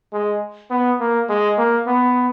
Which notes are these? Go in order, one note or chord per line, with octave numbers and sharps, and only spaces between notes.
G#3
B3
A#3
G#3
A#3
B3